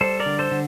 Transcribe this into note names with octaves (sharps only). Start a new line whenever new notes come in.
G3 A4 C5
A#4 D5
D3
A4 C5
D3